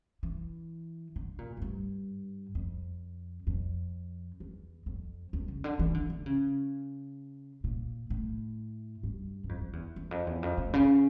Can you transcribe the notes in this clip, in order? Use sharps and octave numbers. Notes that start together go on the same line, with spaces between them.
E3
D3
A#2
A2
G2
F2
F2
E2
F2
E2
C#3
D3
E3
D3
D3
C#3
A#2
A2
G2
G2
F2
F2
E2
E2
F2
E2
F2
A2
C#3